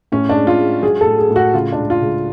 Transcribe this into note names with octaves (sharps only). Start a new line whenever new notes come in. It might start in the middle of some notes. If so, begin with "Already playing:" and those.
A2 C#4
D4
G#3
F4
G#3
F#3 G#4
A4
A2
G#4
A2
F#4
C#3 F4
D4
C#2
F4
C#2